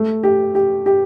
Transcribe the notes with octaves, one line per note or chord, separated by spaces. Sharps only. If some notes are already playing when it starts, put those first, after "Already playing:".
Already playing: A3
G4
G4
G4